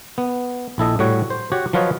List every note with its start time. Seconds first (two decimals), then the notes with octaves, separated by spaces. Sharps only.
0.18 B3
0.78 A#1 E4 A4 D#5
0.99 A2 G3 F#4 C#5
1.30 C5
1.52 F#4 G4 C#5 F#5
1.73 F3 F#3 F4 B4 C#5 D#5